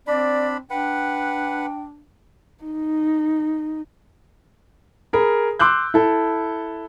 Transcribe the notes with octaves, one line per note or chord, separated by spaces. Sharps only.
C4 D4 D5 B5
D4 B4 F#5 G5
D#4
G#4 A#4 B5
C6 D6 E6 F#6 G6
E4 A4